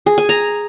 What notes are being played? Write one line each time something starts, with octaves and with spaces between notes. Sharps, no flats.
G#4
G#5
A#5